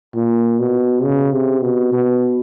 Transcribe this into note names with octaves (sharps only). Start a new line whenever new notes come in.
A#2
B2
C#3
C3
B2
B2